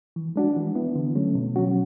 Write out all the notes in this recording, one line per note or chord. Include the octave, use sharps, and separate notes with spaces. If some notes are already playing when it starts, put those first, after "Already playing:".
E3
G#3 D4 F#4
E3
B3 E4
D3
F#3 A3 C#4
B2
F#3 C#4 F#4